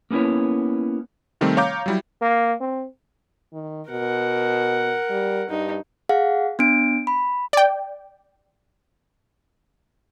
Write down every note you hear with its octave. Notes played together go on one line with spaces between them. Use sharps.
A#3 B3 C#4 E4 C#5
C3 D#3 G3 A3 C4
C#5 F5 A#5 D6 G6
F#3 G3 E4
A#3
C4
D#3
B2 A#4 F#5
G3
G2 D#4
G#4 F5 F#5
B3 D4 D7
B5
D5 G5